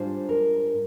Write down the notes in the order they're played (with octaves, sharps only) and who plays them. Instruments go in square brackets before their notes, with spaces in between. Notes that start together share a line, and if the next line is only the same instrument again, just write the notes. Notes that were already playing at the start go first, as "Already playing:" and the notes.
Already playing: [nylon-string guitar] G#2 G3 D4 F4 C5
A#4